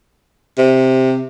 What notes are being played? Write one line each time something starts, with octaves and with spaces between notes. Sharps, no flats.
C3